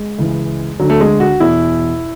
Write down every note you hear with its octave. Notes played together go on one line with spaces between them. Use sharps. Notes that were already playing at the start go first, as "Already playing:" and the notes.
Already playing: G#3
C#2 C#3 E3
D2 D3 F#3
A3
G#3
F#4
E2 B2 E4